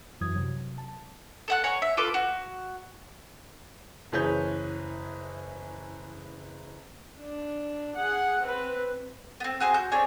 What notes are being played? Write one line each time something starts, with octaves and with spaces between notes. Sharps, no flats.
F#2 E3 F#3 D#6 G#6
C3 F#3
A5
A4 F#5 F#6
C#5 F#5 G#5 A#5
E5
F4 A4 B4 D6
F#4
F#1 E3 G#4 B4 C#5 G6
D4
G#4 F#5
C4 B4
B3 C4
F#4 G#4 C5 G#5
F#4 G6
C4 D4 G#4 C#5